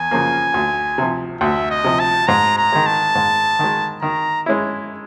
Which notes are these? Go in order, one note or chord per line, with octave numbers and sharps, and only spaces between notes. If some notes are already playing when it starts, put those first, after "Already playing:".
Already playing: E2 G#5
C#3 F3 A#3
D2
C3 F3
D2 E5
D#5
C3 F3
A5
G#2 A#5
A#5
D#3 G#3
A5
G#2
D#3 G#3
D#3 A#5
G#3 C#4 E4